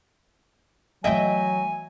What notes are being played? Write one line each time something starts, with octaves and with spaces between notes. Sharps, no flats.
E3 F#3 A3 D#5 E5 G5 G#5